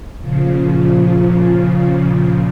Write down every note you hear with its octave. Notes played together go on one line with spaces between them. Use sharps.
A#2 C#3 F3